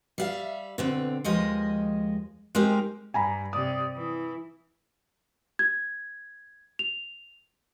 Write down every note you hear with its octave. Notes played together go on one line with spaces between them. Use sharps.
G3 E5 F5
B2 D3 C4
D#2 F3 G#3 D#5
G#3 C4 D#4 G4 A#4
G2 G#5 A#5 B5
C3 D5 D#6
E3
G#6
F7